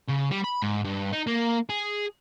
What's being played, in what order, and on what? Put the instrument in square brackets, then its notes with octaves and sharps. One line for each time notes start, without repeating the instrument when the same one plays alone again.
[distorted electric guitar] C#3
G3
B5
G#2
G2
D#4
A#3
G#4